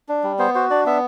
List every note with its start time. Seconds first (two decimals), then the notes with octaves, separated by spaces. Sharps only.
0.09 D4
0.24 G3
0.39 B3 C5
0.54 F#4 C5
0.70 D4 D5
0.86 B3 E5